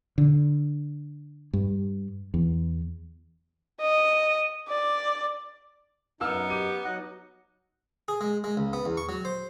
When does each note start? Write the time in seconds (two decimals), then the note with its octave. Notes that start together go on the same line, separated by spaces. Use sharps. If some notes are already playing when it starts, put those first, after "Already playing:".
0.18 D3
1.53 G2
2.34 E2
3.80 D#5
4.68 D5
6.21 F#2 B3 D#4 E6 F6
6.50 G4 D#7
6.85 F#3 D#4 D#5 F#5
8.08 G#4
8.21 G#3
8.44 G#3
8.57 C#2
8.73 B3
8.85 E2
8.97 C#6
9.09 F#3
9.25 C5